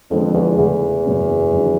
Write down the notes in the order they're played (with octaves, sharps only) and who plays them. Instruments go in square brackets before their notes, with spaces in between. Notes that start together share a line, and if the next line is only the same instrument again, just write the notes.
[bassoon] F2 [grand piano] D3 F3 G#3 B3 D4
[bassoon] E2
[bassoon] E2 [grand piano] C#3 E3 A3
[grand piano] F#2 C#3 F#3 A#3 C#4
F2 D3 F#3